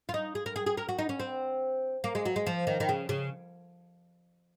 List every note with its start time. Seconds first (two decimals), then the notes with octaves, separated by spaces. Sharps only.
0.09 F4
0.14 D#4
0.35 G#4
0.46 A#4
0.56 G#4
0.66 G#4
0.77 A#4
0.89 F#4
0.99 D#4
1.09 C#4
1.20 C4
2.04 A#3
2.15 G#3
2.25 F#3
2.36 G#3
2.47 F3
2.67 D#3
2.80 D#3
2.89 C#3
3.09 C#3